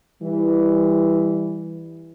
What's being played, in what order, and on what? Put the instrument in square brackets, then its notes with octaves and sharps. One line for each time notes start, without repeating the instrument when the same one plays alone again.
[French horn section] E3 G3